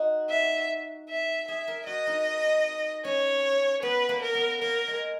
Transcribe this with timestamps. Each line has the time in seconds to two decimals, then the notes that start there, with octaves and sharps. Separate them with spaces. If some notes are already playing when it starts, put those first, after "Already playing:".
Already playing: D#4 F#4
0.30 E5
1.09 E5
1.48 G#4 E5
1.68 A#4
1.86 F#4 D#5
2.07 D#4
3.05 C#4 C#5
3.83 B3 B4
4.09 A#3
4.22 A#4
4.35 B3
4.61 A#3 A#4
4.88 G#3